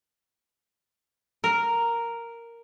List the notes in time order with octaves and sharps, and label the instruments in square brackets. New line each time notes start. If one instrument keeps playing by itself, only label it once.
[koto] A#4